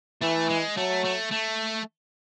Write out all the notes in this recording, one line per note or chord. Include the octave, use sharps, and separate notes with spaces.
E3 A3
G#3
F#3 A3
A3
A3